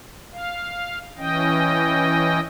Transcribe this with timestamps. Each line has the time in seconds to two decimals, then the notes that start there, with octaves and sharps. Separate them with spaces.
0.33 F5
1.18 E3 C#4 D#5 G5